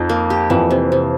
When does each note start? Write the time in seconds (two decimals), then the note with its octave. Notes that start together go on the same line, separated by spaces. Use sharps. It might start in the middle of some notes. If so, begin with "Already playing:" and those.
Already playing: F2 F3 D#4
0.09 A#3
0.30 G4
0.50 F2 E3 F3
0.71 C3
0.92 C3